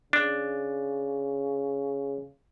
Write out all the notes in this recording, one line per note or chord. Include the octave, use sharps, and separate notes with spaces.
C#3 D4